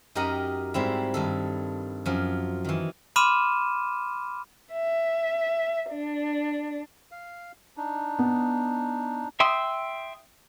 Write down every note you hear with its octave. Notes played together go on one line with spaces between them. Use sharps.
F#2 D#4 G4 A#4 D#5 F#5
G#2 G3 C4 E4
G2 D#3 A4
F#2 F3
D#3 E3
B5 C6 D6 F6 D#7 E7
E5
D4
F5
D4 D#4
B3
E5 G5 C6 D#6 E6